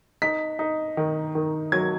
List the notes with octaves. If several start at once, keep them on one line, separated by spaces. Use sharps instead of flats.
D#4 B6
D#4
D#3
D#3
F#3 G#6